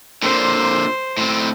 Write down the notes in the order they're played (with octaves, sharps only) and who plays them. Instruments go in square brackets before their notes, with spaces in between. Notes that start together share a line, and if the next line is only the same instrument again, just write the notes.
[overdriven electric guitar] A#2 D3 [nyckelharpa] C5
[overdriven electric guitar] A2 C4